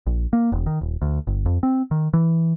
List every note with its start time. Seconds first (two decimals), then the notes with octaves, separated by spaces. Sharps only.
0.07 A#1
0.33 A#3
0.52 E1
0.66 D#3
0.81 D#1
1.02 D2
1.27 G1
1.46 F2
1.63 C4
1.91 D#3
2.14 E3